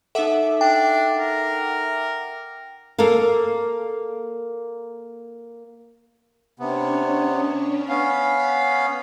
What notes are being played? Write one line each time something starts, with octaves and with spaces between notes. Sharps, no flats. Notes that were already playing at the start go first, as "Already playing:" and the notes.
D#4 A4 E5 F#5 D6
D4 G5
A#4
A#3 A4 A#4 F5
C3 B3 C#4 D4 C#5
B3 C#4 F5 B6